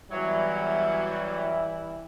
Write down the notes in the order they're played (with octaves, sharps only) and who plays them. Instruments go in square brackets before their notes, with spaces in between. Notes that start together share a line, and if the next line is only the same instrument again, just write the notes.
[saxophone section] E2 F#3 [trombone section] E3 G3 [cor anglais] E4